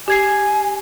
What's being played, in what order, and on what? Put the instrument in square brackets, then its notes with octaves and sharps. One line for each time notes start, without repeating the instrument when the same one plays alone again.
[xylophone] G4 G#6 C7 [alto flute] G#5